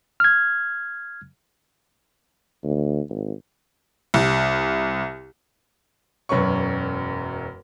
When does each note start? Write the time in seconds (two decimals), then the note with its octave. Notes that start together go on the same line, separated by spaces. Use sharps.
0.20 F6 G#6
2.64 D2
3.10 G#1
4.14 C2
6.29 E1 F#2 C#4 B4 C#6